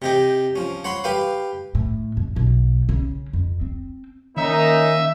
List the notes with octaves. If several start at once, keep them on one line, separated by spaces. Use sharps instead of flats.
C3 D#4 G4
F3 C#4
C#5 F#5 B5 C6
G4 B4 F5
A2
F2
B1
C#3
F2
C4
D#3 A#3 C#4 D#4 E5